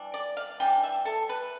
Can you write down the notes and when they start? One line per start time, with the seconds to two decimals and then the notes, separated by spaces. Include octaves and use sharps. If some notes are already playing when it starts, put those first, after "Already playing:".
Already playing: E3 G3 D4
0.14 D5
0.37 F5
0.60 E3 G3 D4 G5
0.83 E5
1.05 A4
1.29 B4